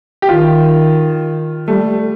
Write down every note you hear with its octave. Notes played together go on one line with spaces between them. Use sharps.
G4
D#3 F4
G3 A3